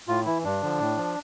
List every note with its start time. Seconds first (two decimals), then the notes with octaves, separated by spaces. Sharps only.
0.08 A2 F4
0.26 E3 E4
0.44 G2 D4
0.62 D3 F3
0.80 A2
0.97 F3